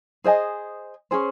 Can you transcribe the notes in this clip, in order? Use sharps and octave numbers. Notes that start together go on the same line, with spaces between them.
G#4 C5 D#5 G#5
C#4 G#4 C5